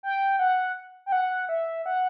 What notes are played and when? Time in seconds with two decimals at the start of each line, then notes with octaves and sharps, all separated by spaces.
0.03 G5
0.39 F#5
1.06 G5
1.12 F#5
1.49 E5
1.86 F#5